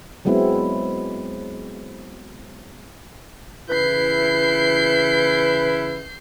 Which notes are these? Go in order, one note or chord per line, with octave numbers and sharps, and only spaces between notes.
F#3 G#3 B3 C4 E4
C#3 E3 E4 B4 G6 C7